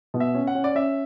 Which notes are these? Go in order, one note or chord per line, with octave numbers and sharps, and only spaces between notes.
B2
E5
C#4
F#5
C#4
D5
C#4 E5